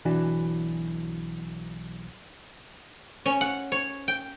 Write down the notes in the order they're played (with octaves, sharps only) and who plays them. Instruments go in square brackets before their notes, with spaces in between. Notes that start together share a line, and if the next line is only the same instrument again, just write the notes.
[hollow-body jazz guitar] B1 E3 D4 F#4
[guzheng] C#4
F#5
C#5
G5